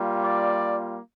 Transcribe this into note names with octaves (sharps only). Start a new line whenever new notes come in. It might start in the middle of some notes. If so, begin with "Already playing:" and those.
Already playing: G3 A#3 F4
D5